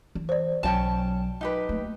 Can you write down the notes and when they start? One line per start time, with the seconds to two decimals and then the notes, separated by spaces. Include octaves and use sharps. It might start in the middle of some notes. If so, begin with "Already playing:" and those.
0.15 E3
0.29 C5 D5
0.63 B1 F#3 C#4 G5 A5
1.41 D#4 G4 B4
1.69 A3 A#3